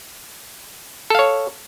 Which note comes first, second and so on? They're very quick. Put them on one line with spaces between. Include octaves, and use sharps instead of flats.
A4 F5 C#5